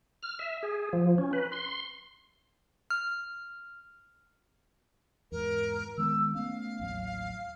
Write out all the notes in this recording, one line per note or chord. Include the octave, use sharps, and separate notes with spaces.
F6
E5
G#4
F3
C#4
B4
C6
C6
F6
E2 G#2 A#4
D#3 G#3 B3 E6
A3 B3 C#4 F5
A1 D#2 F#3